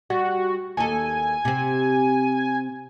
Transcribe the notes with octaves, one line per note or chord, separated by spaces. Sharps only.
G3 F#4
D#2 A4 G#5
C3 C4